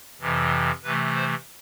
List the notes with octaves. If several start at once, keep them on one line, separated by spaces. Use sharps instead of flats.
F2 C3 E3
C3 E3 A3 B4
C5